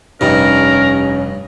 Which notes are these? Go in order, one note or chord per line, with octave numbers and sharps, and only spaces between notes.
F1 G2 G3 C#4 D#4 A#4